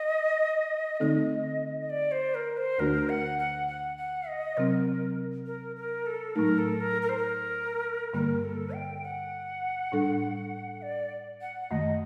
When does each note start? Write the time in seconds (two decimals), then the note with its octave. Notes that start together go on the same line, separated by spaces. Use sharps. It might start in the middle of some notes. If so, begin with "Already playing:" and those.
Already playing: D#5
1.00 D3 A3 C4 D#4 A4 D#5
1.81 D#5
1.90 D5
2.12 C5
2.35 A#4
2.57 C5
2.78 D2 D3 A3 D4 F#4 A#4
3.09 F#5
3.39 F#5
3.68 F#5
3.97 F#5
4.28 D#5
4.57 C3 F#3 C4 A#4
5.46 A#4
5.76 A#4
6.06 A4
6.36 A2 F#3 A3 D#4 A#4
6.59 A4
6.80 A#4
7.02 A#4
7.09 C5
7.17 A#4
8.13 G2 D3 G3 A#3 A#4
8.44 A4
8.74 G5
9.04 F#5
9.92 A2 G3 D4 A4
10.82 D5
11.41 F#5
11.61 F#5
11.71 F#2 D#3 A3 D#5